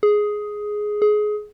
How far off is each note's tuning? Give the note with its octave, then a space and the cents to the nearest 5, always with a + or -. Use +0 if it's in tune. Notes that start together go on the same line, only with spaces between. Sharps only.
G#4 +5
G#4 +20